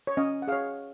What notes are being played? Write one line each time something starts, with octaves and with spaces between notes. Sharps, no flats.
C#5
C#4 D#5
F#5
G#4 C#5 F5